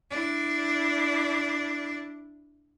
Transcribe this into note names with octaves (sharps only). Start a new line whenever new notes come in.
D4 E4